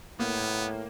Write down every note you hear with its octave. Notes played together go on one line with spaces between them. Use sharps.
A2 A#3 B3